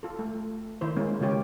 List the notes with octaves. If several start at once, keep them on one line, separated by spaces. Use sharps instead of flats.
F4 A4
A3
D#3 E4 C5
G#3 A#3 C#4 E4
C#3 G#3 F4 G4 C#5